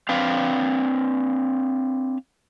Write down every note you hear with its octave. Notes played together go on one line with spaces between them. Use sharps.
C4 D4 B4 F5